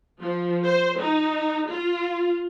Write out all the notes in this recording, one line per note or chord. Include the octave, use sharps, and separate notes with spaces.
F3
C5
D#4
F4